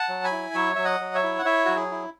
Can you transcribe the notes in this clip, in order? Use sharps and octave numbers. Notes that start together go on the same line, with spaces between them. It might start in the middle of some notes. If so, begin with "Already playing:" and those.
Already playing: F#5 A5
F#3
G#5 B5
E4
F#3 C#5 E5
F#3 E5
D#5 F#5
F#3
C#5 E5
E4
F#5
E4 C#5 E5
F#3 F#4
G#4
E4